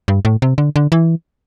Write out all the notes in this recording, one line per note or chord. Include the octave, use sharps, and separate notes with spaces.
G2
A2
C3
D3
D3
E3